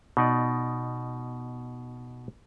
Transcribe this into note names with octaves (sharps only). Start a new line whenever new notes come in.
B2 D#4 D5